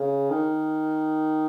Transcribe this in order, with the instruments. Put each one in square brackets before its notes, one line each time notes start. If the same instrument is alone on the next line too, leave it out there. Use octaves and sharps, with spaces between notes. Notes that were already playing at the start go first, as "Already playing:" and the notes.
Already playing: [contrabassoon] C#3
D#3